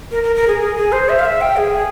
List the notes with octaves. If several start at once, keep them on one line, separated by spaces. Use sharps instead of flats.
A#4
A#4
A#4
G#4
G#4
G#4
C5
E5
F5
E5
G5
G#4